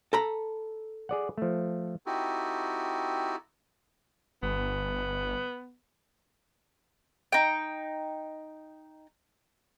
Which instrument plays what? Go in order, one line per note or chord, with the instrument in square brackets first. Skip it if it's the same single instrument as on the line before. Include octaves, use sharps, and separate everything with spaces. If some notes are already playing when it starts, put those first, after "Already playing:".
[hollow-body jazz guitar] A4 A#5 B5
[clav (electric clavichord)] G#4 D5 F#5
F3 A3
[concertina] C4 D#4 E4 F#4 G4 A4
[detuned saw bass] G1 [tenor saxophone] B3
[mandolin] D#4 G5